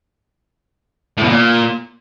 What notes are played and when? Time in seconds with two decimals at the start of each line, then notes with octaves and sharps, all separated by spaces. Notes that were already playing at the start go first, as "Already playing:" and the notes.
1.17 A2
1.23 B2
1.29 A#2